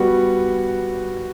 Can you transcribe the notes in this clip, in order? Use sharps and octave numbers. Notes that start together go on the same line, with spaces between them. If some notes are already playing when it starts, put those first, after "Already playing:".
Already playing: G3 B3 F#4